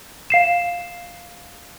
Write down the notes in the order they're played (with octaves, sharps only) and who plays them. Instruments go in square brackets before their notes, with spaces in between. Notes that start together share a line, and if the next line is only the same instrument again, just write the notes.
[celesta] F5 C7 E7